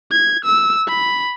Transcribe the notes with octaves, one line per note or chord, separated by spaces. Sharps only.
G#6
E6
B5